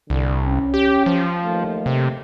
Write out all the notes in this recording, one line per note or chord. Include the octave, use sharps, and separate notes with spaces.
C2 D3
C#4
G4
F3
D#2 A3
C3